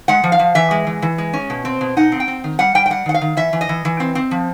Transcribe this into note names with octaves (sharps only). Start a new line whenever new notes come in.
G#3 F#5
F3
F5
F3
E3 E5
G#3
E3
E3
G#3
C#4
B2
C4
B2
D#4 F#5
C4
G5
C4
D#3
G3 F#5
G3 G5
G5
G3 F#5
D#3 F#5
F5
D#3
E3 E5
E3
D#5
E3
E3
C4
C4
F3